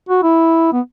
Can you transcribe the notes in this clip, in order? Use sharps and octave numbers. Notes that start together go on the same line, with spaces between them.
F#4
E4
B3